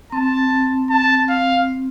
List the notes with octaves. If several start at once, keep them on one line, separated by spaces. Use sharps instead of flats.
C4 A5
A5
F5